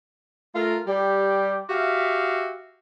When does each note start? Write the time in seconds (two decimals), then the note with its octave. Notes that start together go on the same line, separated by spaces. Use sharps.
0.55 A3 F4 A#4
0.87 G3 G4
1.69 F#4 G4 E5 F5